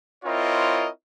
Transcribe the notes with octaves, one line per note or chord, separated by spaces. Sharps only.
C4 E4 F4 A#4 C#5 D#5